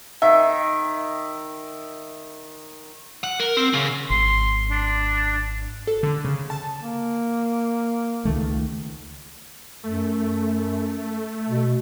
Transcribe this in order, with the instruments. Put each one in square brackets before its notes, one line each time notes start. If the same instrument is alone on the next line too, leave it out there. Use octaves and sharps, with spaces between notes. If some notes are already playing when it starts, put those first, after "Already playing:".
[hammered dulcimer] D#3 [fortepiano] E5
[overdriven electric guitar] F#5
A#4
C4
C#3
[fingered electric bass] G#1 [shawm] C6
[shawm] D4
[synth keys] A4
D3
C#3
A5
[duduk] A#3
[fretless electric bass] C#2 D#3 A3
[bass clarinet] F#2 [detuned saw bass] A3
[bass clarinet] B2